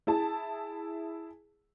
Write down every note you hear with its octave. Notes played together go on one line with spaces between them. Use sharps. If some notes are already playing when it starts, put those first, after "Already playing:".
E4 G#4 A5